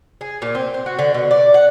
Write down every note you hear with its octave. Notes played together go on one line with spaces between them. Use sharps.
G#4
A#2
C4
C5
F#4
D3
B2
D5
F#5